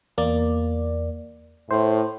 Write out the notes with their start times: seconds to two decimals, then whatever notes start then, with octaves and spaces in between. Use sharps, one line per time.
0.18 E2 A#3 D5
1.71 A2 C5